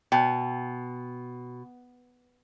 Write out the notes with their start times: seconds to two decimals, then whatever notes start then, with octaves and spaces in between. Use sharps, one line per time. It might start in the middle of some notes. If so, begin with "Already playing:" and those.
0.12 B2 G5